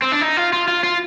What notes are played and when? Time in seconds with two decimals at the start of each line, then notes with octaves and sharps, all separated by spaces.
0.02 C4
0.12 D4
0.21 D#4
0.37 F4
0.53 F4
0.68 F4
0.84 F4